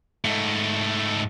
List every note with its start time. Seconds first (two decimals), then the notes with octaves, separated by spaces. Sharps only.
0.25 G#2 A3